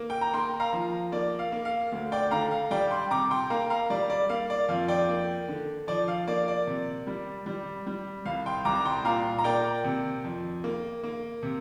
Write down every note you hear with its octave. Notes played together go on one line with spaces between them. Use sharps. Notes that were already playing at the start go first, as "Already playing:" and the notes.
Already playing: A#3
G5
A#5
A#3 G5 C6
F5 A#5
F3
A#3 D5
F5
A#3
F5
D2
D5 G5
D3 F5 A#5
F5
G3 D5 G5
G5 C6
C3 A#5 D6
G5 C6
A#3 F5 A#5
F5 A#5
G3 D5
D5
A#3 F5
D5
F2 F5
D5 G5
A#3
D3
F3 D5
F5
A#3 D5
D5
C3
G3
G3
G3
C2 F5
G5 C6
C2 A#5 D6
A#5
G5 C6
A#2 F5 A#5
A#5
A#3 D5 G5
C3
F2
A#3
A#3
C3